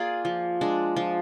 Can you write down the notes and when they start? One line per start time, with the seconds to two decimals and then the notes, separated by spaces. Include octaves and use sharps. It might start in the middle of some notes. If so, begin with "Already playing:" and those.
Already playing: A#3 F4 G#4 D5
0.25 F3
0.61 G#3 D4
0.96 F3